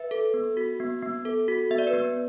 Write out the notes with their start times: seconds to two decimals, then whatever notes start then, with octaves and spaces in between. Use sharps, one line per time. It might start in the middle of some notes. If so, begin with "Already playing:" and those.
Already playing: B4 E5
0.11 A4
0.34 B3
0.57 F#4
0.80 B3
1.02 B3
1.25 A4
1.48 F#4
1.71 B3 E5
1.78 D5
1.87 B4
1.93 B3 D5